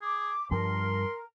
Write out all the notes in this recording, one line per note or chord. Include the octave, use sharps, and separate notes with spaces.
G#4 D6
G2 F3 G3 A#4 C6